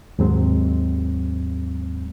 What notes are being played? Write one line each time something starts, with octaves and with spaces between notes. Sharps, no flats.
D#2 G#2 F#3 G#3 C4